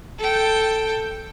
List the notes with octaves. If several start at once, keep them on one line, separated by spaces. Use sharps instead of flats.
A4 G5